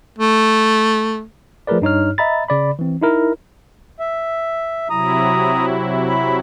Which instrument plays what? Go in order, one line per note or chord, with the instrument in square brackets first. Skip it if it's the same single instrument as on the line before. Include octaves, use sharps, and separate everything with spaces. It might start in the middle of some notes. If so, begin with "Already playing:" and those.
[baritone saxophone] A3
[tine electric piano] F3 A3 G#4 A#4 B4 D5
G2 D#4 C#5 F6
D#5 E5 A#5 B5 A6
C#3 D5 B5
E3 C4
D#4 E4 A#4
[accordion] E5
[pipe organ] C3 F#3 E4 [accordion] A#5 D#6
[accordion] B5